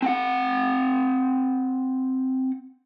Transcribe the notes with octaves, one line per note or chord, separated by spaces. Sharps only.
C4 F#5